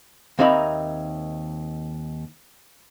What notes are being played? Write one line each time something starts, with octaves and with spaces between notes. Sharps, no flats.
D#2 C4 D#4 A#4 E5 B5